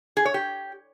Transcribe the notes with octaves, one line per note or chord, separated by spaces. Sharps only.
G#4
C#5
G4